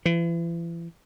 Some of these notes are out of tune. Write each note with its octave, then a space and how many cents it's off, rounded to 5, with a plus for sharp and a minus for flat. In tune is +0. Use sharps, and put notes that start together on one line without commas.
E3 +40